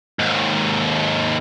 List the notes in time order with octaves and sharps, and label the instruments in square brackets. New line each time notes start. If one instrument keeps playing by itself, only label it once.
[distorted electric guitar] D#2 G#2